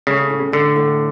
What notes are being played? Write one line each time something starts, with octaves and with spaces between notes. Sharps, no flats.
C#3 A3
A2
D3 A3
A2